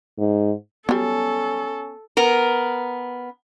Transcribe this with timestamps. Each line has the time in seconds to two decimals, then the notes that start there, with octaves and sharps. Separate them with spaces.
0.18 G#2
0.89 F#3 G3 B3 C#4 A4
2.17 B3 A#4